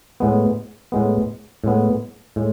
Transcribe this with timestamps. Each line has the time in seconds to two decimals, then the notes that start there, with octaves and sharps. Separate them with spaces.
0.20 A2 G#3 B3
0.92 A2 G#3 B3
1.64 A2 G#3 B3
2.36 A2 G#3